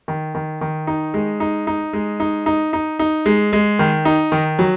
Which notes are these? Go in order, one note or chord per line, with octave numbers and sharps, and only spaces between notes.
D#3
D#3
D#3
D#4
G#3
D#4
D#4
G#3
D#4
D#4
D#4
D#4
G#3
G#3
D#3
D#4
D#3
F#3